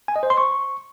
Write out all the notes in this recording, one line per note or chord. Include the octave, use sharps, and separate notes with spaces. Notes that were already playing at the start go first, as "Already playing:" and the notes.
G#5
D#5
C5
C6
C#6